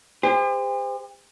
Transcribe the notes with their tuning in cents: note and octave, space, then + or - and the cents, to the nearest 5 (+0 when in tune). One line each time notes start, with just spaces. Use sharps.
G4 +45 C5 -25